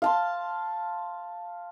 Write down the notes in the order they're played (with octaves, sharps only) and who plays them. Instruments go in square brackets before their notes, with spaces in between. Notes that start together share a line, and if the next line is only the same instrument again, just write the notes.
[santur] F5 A5 C6